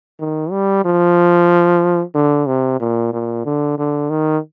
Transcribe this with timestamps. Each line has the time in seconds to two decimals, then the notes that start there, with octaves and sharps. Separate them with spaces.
0.20 D#3
0.51 G3
0.85 F3
2.15 D3
2.47 C3
2.80 A#2
3.13 A#2
3.45 D3
3.78 D3
4.10 D#3